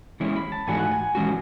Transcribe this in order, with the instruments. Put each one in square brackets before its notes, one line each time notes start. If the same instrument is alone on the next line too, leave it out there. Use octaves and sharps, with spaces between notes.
[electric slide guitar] E3 G#3 C#4 E4
[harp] B5
A5
[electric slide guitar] G#2 E3 A3 D#4 F#4 [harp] G#5
[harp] F#5
G#5
[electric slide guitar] E3 G#3 C#4 F#4